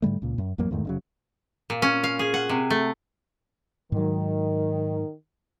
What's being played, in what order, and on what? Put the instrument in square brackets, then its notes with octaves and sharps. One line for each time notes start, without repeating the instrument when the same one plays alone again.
[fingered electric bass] G#2 D3 G3 A3
C#2 A#2
F#2
A1 F2 F#3 A#3
E2 G#2 D#3 A3
F1 C#3 F#3
[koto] A#2
C#4
F5
G#4
F#5
C3
A3
[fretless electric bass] G#2 F#3 [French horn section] D#3